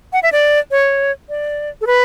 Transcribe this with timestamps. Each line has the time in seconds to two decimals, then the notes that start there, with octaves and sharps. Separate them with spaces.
0.13 F#5
0.23 E5
0.32 D5
0.71 C#5
1.29 D5
1.81 A4
1.87 B4